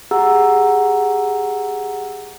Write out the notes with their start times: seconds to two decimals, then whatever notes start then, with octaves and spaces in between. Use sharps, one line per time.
0.11 G4 G#4 F#5 A#5 E6